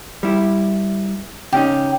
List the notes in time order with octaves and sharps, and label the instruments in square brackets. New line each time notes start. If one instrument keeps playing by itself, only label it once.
[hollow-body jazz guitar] G3 E4
[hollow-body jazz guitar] C#3 C#4 D#4 [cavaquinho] G4